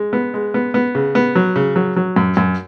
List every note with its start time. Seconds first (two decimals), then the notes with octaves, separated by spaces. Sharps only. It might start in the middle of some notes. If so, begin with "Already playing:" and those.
Already playing: G#3
0.13 B3
0.34 G#3
0.54 B3
0.74 B3
0.95 C#3
1.15 B3
1.35 F#3
1.56 C#3
1.76 F#3
1.96 F#3
2.16 F#2
2.37 F#2